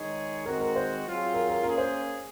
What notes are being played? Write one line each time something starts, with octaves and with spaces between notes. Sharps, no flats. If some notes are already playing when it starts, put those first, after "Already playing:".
Already playing: D#3 G#3 D#4 G#4 C#5
D#3 G#3 C4 F#4 A#4
A#4
C5
F#3 C4 F4 G#4
A#4
A#4
A#3 C#4 G#4 A#4
C5